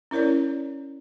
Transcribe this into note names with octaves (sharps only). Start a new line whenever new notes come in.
C#4 E4 A#4 C#5 D5